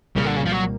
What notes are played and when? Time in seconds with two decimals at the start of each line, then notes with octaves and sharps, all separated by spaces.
0.16 C2 A#2 C#3 G3 A#3
0.26 D3
0.37 C#3
0.46 F3
0.52 F#3